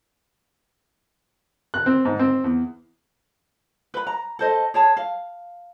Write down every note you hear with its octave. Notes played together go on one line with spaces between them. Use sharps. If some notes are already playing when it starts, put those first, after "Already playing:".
F#6
C4
G#2
C4
E2
B4 B5
A#5
A4 C5 D#5
G#4 C#5 A5
F5